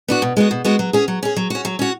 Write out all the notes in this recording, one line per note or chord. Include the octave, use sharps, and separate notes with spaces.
B3 D4 F#4
B2
G#3 B3 F#4
B2
G#3 B3 F#4
F#3
C#4 G#4
F#3
C#4 G#4
F#3
C#4 F#4
F#3
C#4 F#4